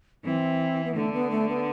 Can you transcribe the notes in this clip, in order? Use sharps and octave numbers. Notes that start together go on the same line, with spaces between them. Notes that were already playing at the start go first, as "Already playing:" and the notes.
E3 C4
B3
D3 A3
B3
A3
B3